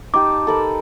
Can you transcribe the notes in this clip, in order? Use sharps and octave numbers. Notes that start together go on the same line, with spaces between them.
D#4 G4 A5 D6
A4 A#4 B5